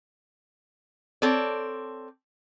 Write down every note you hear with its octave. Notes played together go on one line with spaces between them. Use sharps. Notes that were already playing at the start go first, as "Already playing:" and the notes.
C4 A4 C#5 D5